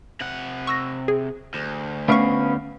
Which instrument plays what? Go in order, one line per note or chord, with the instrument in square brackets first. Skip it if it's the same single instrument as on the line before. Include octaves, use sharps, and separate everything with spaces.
[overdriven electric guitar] C3 F#5
[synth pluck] C#6 E6 A#6
G#4
[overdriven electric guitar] D2
[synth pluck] A3 C#6 [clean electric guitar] B3 C#4 F5